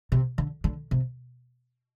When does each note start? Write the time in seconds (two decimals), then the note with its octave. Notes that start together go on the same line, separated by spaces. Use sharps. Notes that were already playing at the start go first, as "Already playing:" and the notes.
0.12 C3
0.38 D3
0.64 D3
0.91 C3